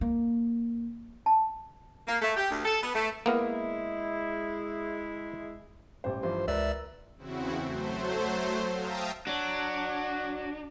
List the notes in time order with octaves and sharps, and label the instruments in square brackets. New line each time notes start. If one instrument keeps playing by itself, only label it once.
[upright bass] A#3
[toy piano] A5
[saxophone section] A#3
A3
G4
D2
A4
B3
A3
[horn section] G#3 E4 [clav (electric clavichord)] A#3 B3 A#4
[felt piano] A1 G3 C5
[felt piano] G2 E3 F3 [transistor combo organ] C5
[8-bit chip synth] C#2 D5 [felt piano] A#4 B4 [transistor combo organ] E5
[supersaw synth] E2 C#3 C4 E4 F#4
F#3 A3 C5
E5 F5 G5 A5 A#5 D#6
[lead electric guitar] D4 [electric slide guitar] F#4 C#5